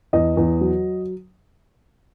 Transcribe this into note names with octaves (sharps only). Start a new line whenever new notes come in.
E2 D#5
E2
F#3